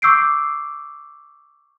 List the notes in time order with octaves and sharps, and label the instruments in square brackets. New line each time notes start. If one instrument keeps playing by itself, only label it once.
[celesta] C#6 D6 E6 G6 C7 D7